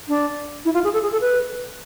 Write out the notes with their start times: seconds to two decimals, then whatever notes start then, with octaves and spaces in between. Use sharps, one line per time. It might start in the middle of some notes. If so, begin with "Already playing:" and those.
0.08 D4
0.65 E4
0.74 F4
0.84 G#4
0.93 A4
1.03 G#4
1.12 A4
1.21 B4